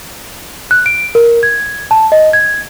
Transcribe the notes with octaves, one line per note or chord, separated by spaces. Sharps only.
F#6
D7
A#4
G#6
A5
D#5
G#6